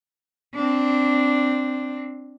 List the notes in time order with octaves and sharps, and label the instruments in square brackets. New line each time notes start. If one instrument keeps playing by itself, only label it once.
[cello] C4 D4